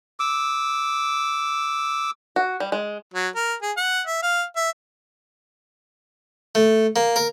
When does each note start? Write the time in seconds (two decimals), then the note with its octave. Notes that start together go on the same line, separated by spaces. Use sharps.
0.20 D6 E6
2.36 F#4
2.60 G3
2.72 G#3
3.14 F#3
3.36 A#4
3.62 G#4
3.77 F#5
4.07 E5
4.22 F5
4.56 E5
6.55 A3
6.96 A#3
7.16 A#4